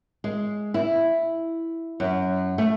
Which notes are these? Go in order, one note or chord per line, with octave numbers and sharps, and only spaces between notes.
G#3
E4
F#2
A3